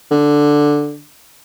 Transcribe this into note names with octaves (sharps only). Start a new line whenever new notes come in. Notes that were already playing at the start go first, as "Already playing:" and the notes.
D3